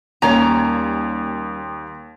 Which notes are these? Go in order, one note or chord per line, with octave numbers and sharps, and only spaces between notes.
D#2 G3 A#3 C#4 C#5 A#5